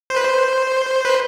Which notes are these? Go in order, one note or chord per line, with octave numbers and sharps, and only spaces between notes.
C5
B4
C5
B4